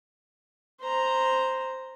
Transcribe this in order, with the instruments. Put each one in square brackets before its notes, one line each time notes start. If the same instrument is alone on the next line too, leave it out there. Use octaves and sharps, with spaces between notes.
[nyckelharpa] C5 A#5